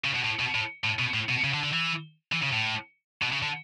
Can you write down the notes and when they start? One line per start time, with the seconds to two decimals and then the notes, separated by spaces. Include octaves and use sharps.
0.04 C#3
0.15 B2
0.24 A2
0.39 B2
0.55 A2
0.84 A2
0.99 B2
1.14 A2
1.29 B2
1.44 C#3
1.53 D3
1.64 D3
1.73 E3
2.33 E3
2.43 C#3
2.53 A2
3.22 B2
3.33 C#3
3.42 D3